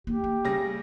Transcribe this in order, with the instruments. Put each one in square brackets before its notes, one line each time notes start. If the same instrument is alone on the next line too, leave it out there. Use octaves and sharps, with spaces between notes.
[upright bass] A#3 E4 [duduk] G4
[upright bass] A#3
[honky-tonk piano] C#3 G3 A#6